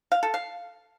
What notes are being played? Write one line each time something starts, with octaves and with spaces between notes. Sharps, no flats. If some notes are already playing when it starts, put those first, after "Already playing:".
F5
A4
F5